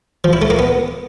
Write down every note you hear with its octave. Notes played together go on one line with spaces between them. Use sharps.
F3
E4
A3
A#3
B3